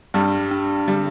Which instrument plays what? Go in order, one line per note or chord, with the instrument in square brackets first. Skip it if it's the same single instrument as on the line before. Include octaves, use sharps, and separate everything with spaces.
[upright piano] G2 G3 [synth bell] D4
[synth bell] D4
[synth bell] D3 [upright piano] G3